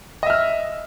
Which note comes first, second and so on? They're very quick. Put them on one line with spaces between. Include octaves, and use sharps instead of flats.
D#5 E5 F6 E6